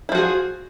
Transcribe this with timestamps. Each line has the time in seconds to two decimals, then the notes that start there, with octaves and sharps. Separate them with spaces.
0.09 E4
0.12 F3
0.15 F#4
0.18 G#4